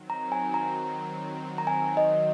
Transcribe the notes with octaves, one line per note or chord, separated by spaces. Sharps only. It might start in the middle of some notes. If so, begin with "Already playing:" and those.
Already playing: D#3 F#3 C4
A#5
G#5
A#5
A#5
G#5
D#5